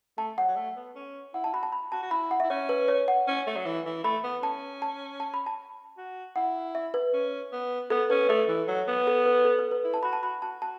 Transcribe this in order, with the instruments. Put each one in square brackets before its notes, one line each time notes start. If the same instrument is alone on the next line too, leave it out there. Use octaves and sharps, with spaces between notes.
[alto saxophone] A3 [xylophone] A5
[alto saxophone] F#3 [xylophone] F#5
[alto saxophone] F#3
A3
B3
C#4
[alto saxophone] E4 [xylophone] F#5
[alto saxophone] E4 [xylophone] A5
[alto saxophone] F#4 [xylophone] B5
[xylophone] A5
B5
[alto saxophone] F#4 [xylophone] A5
[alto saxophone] F#4
[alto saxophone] E4 [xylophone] B5
[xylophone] F#5
[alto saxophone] E4 [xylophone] E5
[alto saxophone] C#4 [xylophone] C#5
[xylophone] B4
C#5
F#5
[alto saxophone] C#4
A3
F#3
E3
E3
[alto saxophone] A3 [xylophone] B5
[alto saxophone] B3
[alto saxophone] C#4 [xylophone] A5
[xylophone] A5
A5
B5
A5
[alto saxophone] F#4
[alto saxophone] E4 [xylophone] F#5
[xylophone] E5
B4
[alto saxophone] C#4
B3
[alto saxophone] B3 [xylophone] A4
[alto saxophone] C#4 [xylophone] B4
[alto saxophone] A3 [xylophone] A4
[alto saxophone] E3
F#3
B3
[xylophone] A4
B4
A4
B4
B4
[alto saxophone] E4
[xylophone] A5
[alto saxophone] F#4 [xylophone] B5
[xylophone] A5
[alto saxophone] F#4 [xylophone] B5
[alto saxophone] F#4 [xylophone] A5
[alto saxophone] F#4 [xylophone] A5